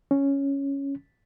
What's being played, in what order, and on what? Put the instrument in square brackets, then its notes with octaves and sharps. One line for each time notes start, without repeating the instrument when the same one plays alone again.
[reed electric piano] C#4